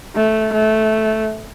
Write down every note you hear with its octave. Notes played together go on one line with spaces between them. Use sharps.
A3
A3